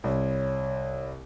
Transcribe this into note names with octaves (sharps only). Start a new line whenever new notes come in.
C2 C#5